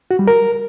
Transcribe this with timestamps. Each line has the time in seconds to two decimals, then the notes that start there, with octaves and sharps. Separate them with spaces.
0.11 F#4
0.19 G3
0.28 A#4